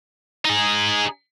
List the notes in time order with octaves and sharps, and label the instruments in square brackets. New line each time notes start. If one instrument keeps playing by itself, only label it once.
[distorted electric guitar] D#4 G#4